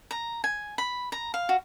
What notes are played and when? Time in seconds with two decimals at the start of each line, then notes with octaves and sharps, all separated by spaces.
0.11 A#5
0.44 G#5
0.78 B5
1.12 A#5
1.34 F5
1.49 F#4